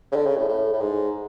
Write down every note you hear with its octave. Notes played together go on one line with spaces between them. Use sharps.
C#3
D3
C#3
A2
A2
A2
G#2